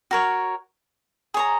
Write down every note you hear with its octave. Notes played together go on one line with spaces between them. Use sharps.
F#4 A#4 C#5
G#4 C#5 A#5